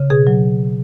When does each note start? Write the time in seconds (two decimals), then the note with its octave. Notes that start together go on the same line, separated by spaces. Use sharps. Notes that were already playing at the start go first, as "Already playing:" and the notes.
Already playing: C#3
0.10 B2 G#4
0.27 F#3